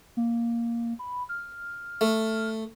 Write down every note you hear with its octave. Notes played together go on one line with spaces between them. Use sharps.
A#3
B5
F6
A3